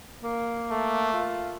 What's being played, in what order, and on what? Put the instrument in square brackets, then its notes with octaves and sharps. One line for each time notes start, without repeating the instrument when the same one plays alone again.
[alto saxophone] A#3
[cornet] A3
[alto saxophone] F4